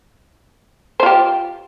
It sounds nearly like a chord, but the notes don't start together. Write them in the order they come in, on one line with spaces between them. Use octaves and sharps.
C5 F4 G4